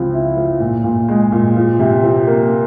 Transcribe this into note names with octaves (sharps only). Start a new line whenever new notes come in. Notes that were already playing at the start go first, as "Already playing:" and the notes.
Already playing: C#2 F3 C4
E4
F3
A#2
A#2
G#3
A#2
F3
C3
F3
A#3